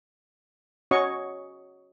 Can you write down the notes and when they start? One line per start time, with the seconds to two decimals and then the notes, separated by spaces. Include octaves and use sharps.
0.91 C#4 F#4 C#5 D#5 C#6